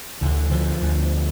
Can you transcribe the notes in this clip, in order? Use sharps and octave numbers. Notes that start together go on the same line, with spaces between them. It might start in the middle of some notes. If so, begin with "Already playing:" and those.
D2 D3 E3
D3 F3
D2 D3